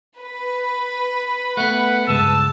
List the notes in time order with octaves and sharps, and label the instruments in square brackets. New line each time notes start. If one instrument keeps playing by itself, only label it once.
[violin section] B4
[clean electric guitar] A3 B3 [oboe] F#5
[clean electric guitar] C#2 G2 G#3 [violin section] A5 [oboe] E6